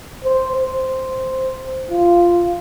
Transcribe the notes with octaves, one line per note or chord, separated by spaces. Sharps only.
C5
C5
F4